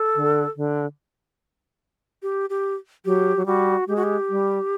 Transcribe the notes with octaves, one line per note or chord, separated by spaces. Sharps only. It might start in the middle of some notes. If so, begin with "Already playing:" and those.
Already playing: A4
D3
D3
G4
G4
F#3 G4
F#3
G3 F#4
G#3 G4
F#4
G4
G3